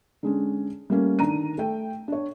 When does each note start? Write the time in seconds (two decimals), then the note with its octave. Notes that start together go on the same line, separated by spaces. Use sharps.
0.23 D3 G#3 C#4
0.90 G3 A3 A#3 C#4
1.19 D3 D#3 D4 A#5 D#7
1.58 A3 G5
2.08 D4 C#5